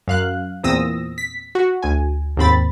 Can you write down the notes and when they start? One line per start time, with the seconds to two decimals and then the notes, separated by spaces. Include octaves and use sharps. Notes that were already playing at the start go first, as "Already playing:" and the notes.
0.08 F#2 F5 F#6
0.64 E2 A#2 C4 D#6 E6 A#6
1.18 B6
1.55 F#4
1.83 D2 G#5
2.37 D#2 G#2 C4 B5 A6